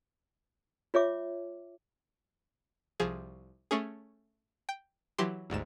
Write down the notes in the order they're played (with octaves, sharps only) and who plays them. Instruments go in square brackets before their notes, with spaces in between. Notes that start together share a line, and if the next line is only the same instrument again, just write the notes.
[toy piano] F4 C#5 E5 D6
[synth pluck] C2 F3 G#4
A3 C#4 G#4
G5
E3 F#3 G4 C6
G1 D2 G#2 E7